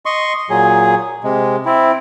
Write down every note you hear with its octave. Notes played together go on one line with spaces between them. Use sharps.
D#5 C6 C#6
A#2 F#3 G#4
C3 G#3
C4 E4